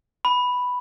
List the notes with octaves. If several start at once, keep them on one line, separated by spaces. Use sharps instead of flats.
B5